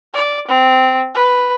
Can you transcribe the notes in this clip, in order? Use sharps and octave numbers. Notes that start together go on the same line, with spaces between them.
D5
C4
B4